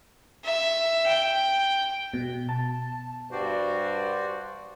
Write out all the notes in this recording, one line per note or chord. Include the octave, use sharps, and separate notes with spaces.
E5
G5
B2
A5
G2 F#4 C5 D5